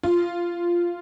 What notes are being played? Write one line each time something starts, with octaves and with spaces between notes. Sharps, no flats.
F4